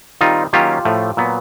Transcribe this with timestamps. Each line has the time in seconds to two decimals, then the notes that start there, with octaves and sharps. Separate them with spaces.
0.21 D#3 G3 C4 D#4 F4
0.53 D#3 F#3 A#3 C#4 F4 G4
0.85 A2 F3 A3
1.17 A#2 F#3 B3